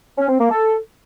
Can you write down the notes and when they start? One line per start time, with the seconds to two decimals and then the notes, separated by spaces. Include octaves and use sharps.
0.18 C#4
0.29 C4
0.40 A#3
0.50 A4